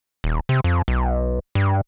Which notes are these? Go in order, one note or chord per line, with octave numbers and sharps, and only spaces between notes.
D#1
C3
F2
B1
G2